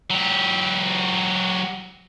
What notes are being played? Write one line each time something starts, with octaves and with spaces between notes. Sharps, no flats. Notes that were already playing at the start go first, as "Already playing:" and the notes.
F#3 G4